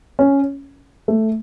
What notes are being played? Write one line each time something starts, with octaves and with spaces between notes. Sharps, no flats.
C#4
A3